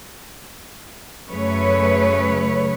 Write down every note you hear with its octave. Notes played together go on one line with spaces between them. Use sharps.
F#2 C#3 A3 B4 C#5